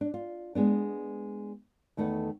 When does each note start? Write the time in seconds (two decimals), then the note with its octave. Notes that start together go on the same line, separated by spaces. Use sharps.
0.01 D4
0.14 F4
0.55 G#3 B3 D4
1.97 E2 D#3 A3 B4 F#5